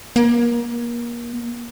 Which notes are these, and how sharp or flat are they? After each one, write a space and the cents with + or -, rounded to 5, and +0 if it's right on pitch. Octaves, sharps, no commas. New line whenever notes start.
A#3 +30